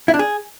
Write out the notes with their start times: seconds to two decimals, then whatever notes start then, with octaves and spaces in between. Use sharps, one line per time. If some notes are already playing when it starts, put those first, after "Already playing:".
0.08 E4
0.14 D4
0.19 G#4